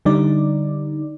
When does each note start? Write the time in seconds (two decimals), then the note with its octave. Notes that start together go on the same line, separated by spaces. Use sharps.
0.05 D3 G3 D#4 D5